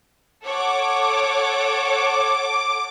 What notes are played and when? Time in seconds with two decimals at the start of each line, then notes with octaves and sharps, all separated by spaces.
0.42 A4 C#5 F#5 D6